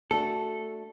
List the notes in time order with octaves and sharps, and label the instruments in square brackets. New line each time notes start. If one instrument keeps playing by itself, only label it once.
[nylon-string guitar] A3 D4 F#4 [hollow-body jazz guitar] A4